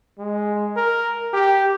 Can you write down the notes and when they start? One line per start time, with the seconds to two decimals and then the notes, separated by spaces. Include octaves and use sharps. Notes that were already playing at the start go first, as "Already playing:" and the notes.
0.19 G#3
0.77 A#4
1.34 G4